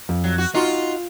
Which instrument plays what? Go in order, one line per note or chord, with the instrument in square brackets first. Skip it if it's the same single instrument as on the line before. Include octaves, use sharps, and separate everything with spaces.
[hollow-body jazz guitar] F2
[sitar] F#3
F#4
[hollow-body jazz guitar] D#4 F#4 [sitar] F4